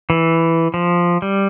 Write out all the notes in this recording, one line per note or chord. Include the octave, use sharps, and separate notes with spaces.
E3
F3
G3